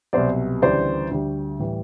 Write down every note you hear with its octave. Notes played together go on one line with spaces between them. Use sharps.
C2 B2 F#3 C5 D5
D2 C#3 E3 G3 C5 D5
D2 D3 G3
A2 E3 G3